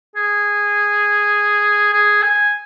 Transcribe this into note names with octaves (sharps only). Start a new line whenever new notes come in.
G#4
G#4
G#5